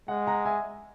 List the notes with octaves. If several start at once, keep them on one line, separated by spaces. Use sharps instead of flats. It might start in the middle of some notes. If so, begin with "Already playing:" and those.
G#3 F#5
F#5 A#5
E5 G#5